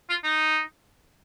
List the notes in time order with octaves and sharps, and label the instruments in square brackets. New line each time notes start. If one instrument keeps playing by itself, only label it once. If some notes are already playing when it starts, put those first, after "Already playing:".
[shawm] F4
D#4